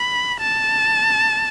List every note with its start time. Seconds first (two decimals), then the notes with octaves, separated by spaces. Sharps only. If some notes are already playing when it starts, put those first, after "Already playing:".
Already playing: B5
0.40 A5